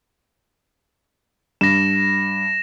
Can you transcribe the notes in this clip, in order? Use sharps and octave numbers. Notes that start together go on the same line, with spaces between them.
G2 A#6 E7